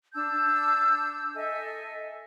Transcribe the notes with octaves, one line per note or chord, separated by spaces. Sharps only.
D4 A5 E6 G6
A4 D#5 E5 G#5